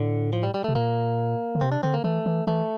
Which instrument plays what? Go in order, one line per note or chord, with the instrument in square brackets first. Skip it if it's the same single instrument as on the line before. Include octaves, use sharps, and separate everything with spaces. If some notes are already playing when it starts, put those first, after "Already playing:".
Already playing: [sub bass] A2 [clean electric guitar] D3
[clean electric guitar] F3
G3
G3
[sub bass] C3 [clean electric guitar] A3
[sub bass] A#2 [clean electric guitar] A#3
[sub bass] D3
[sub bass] C3 [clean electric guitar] C4
[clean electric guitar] D4
[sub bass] D3 [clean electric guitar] C4
[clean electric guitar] A#3
[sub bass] E3 [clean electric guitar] A3
[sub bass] E3
[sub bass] E3 [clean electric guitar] A3